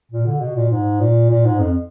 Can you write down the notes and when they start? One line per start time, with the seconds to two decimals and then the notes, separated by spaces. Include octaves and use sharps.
0.11 A#2
0.26 D3
0.41 B2
0.56 A#2
0.71 G#2
1.00 A#2
1.30 A#2
1.45 G#2
1.59 F2